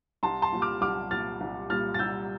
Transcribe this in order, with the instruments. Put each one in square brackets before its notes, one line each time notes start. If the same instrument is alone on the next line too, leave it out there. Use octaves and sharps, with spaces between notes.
[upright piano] C2 A5 C6
A5 C6
A#2 G3
D6 F6
C2 D6 F6
A#2 G3 F6 A6
C2
A#2 G3 F6 A6
A6
C2 E6 G6